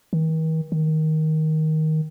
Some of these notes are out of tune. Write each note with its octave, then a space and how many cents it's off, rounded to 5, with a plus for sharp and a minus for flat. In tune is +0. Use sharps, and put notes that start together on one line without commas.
D#3 +45
D#3 +10